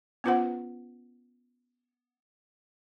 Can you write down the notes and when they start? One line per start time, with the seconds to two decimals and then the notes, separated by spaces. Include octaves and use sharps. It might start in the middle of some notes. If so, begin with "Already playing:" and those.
0.24 B3 C#4 F4 B4 C5 F#5